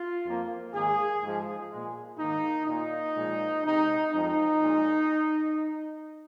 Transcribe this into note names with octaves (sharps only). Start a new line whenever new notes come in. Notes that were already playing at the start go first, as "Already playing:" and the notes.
Already playing: F4
F2 F3 A#3
G#2 D#3 A#3 G#4
G#2 F3 G#3
A#2 G#3
G#2 D#3 A#3 D#4
A#2 A#3 D#4
A#2 F3 G#3
C3 G#3 D#4
F2 F3 G#3 D#4
A#2 G#3